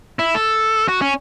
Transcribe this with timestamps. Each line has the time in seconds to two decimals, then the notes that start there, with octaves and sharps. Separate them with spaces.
0.19 E4
0.35 A4
0.88 F#4
1.01 C#4